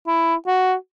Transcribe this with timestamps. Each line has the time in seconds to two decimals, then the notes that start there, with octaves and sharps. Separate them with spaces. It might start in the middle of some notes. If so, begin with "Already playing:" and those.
0.07 E4
0.47 F#4